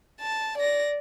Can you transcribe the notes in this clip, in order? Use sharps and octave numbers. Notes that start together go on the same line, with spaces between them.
A5
D5 A#6